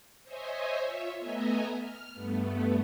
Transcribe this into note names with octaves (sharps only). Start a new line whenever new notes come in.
C5 C#5 D#5 E5 G#5
F4 C#5 E5
A3 B3 D#5 E5 G#5 A#5
F6
G2 A3 B3